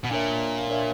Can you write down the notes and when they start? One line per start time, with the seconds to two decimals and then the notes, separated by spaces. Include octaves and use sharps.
0.05 B2
0.11 A#2 D4 A#4 C#5 E5
0.68 D4 A#4 C#5 E5